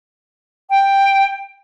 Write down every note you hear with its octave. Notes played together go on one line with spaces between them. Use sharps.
G5